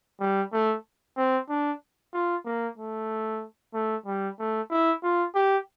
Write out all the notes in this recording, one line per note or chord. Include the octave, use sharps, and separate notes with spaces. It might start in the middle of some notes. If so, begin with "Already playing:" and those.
G3
A3
C4
D4
F4
A#3
A3
A3
G3
A3
E4
F4
G4